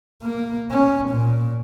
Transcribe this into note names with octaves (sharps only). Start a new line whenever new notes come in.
A#3
C#4
A#2